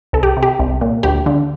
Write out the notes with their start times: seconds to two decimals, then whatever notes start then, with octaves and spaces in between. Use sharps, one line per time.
0.13 C2 A4
0.23 G4
0.37 C3
0.43 G4
0.59 C2
0.81 A#2
1.03 D2 G4
1.26 D3